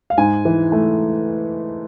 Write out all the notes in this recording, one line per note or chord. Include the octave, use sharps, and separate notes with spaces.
F5
G#2 G#5
E3
A3